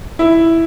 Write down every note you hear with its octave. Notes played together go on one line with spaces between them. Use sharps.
E4